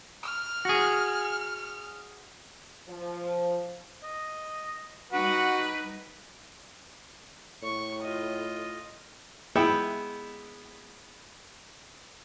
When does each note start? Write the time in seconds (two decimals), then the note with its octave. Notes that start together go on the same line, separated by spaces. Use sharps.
0.23 F6
0.65 F#4 G#4
2.88 F3
4.04 D#5
5.12 G3 D#4 F#4 B4 F#5
7.63 A2 C#6
8.02 F4 D#5
9.55 G#3 B3 E4 E5 G5